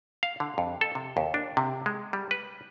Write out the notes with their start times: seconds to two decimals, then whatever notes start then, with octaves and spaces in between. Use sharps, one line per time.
0.23 F5
0.40 D3
0.58 F2
0.81 A4
0.95 C3
1.17 D#2
1.34 D4
1.57 C3
1.86 G#3
2.13 G3
2.31 B4